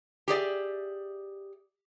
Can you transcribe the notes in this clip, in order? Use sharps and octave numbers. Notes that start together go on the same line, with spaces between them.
G4 G#4 D5 E5